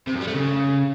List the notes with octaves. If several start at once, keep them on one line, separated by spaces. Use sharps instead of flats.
C3
F#2
G3
A3
C#3